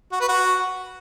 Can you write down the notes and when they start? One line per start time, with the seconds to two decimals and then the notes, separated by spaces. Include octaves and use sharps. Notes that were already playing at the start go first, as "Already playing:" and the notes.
0.12 F#4
0.20 B4
0.29 F#4